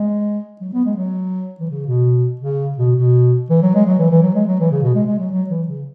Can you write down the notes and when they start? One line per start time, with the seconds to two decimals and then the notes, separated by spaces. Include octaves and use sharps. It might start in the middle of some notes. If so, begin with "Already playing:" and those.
Already playing: G#3
0.61 F#3
0.73 B3
0.85 G#3
0.97 F#3
1.60 E3
1.70 C#3
1.87 B2
2.41 C#3
2.78 B2
2.95 B2
3.50 E3
3.62 F#3
3.75 G#3
3.86 F#3
3.98 E3
4.11 E3
4.22 F#3
4.35 G#3
4.47 F#3
4.60 E3
4.71 C#3
4.83 B2
4.95 G#3
5.07 G#3
5.19 F#3
5.32 F#3
5.50 E3
5.68 C#3